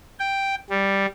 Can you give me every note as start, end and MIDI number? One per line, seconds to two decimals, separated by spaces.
0.19 0.55 79
0.70 1.06 55